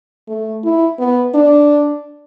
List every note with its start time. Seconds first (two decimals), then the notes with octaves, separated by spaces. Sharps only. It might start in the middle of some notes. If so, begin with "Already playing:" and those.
0.28 A3
0.64 E4
0.99 B3
1.35 D4